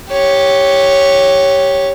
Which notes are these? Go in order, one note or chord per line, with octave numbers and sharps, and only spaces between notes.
G4 C#5